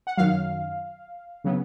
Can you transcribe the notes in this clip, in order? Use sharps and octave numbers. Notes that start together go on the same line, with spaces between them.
F#5
F#2 D#3 F#3 F5
C#3 F#3 B3